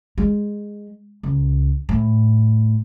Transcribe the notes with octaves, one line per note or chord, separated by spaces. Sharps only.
G#3
C#2
A2